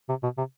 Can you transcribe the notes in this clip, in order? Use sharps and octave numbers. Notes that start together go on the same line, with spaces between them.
C3
B2
C3